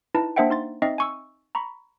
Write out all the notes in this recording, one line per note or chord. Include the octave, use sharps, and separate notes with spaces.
D#4 E4 B4 A5
A#3 D4 C5 E5 F#5 G5
D#4 C6 A6
C4 D#4 D#5 E5 A6 C7
G#5 C#6 E6
A#5 B5 C#6